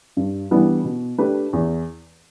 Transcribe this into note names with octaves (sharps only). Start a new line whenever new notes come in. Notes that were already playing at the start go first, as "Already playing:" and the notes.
G2
E3 G3 B3 D4
B2
A3 D4 G4 B4
E2